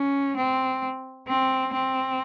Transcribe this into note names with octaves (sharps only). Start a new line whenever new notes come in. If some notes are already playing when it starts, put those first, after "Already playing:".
Already playing: C#4
C4
C4
C4